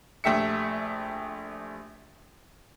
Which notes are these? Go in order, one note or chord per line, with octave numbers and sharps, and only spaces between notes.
A#1 A3 G4 E5 C#7